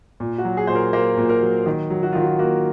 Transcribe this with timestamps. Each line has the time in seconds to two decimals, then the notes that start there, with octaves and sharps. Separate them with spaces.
0.20 A#2
0.38 F#4
0.45 F#3
0.57 G#4
0.67 A#2 C5
0.75 A#4
0.93 A#3 C5
1.17 A#2
1.29 A#4
1.42 F#3
1.66 D#3
1.90 F#3
2.03 F#4
2.13 D#3 F4
2.22 F#4
2.39 A#3 F#4